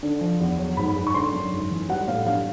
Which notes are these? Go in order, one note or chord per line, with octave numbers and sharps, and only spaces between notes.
D3
F3
E2
F#3
G#2 B5
G#2
C#6
D3 C6
F#2
G#2
E3
G3 F#5
A2 F5
G2 F5